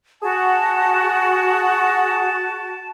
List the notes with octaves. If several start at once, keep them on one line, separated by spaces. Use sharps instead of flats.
F#4 G#4 A5